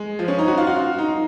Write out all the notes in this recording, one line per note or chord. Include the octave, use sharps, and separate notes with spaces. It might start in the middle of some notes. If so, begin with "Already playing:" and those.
Already playing: G#3
F3
C#4
D#4
F#4
F4
F#4
F4
D#4